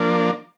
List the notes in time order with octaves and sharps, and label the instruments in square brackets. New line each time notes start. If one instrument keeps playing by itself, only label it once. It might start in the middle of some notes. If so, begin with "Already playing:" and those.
Already playing: [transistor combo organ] F3 A#3 D4